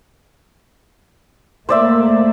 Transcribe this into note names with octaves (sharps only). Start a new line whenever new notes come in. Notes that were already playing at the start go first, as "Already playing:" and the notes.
A3 A#3 C5 D5 E5